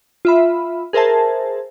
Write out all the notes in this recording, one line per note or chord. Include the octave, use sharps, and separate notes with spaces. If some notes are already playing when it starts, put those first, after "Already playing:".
F4 E5 B5
G#4 A#4 C5 E5 A5